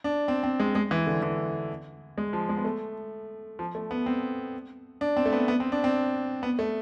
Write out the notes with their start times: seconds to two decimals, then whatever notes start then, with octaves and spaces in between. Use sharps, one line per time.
0.04 D4
0.28 C4
0.43 C4
0.60 G#3
0.75 G#3
0.91 E3
1.07 D3
1.22 E3
2.18 G#3
2.33 F3
2.49 G#3
2.57 B3
2.65 A3
3.59 F3
3.75 A3
3.91 B3
4.06 C4
5.01 D4
5.17 C4
5.26 A3
5.33 B3
5.48 B3
5.60 C4
5.72 D4
5.84 C4
6.43 B3
6.59 A3